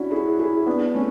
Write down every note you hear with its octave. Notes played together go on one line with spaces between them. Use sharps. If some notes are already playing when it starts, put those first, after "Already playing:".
Already playing: C#4 D4 E4 F#4
E4 G#4
E4 G#4
B3 D4
A3 C#4